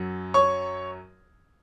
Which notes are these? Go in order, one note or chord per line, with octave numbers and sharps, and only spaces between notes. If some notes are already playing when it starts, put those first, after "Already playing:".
Already playing: F#2 F#3
C#5 C#6